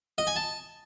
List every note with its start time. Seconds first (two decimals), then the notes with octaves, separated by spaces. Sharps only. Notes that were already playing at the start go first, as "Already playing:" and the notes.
0.18 D#5
0.27 G#5
0.36 A5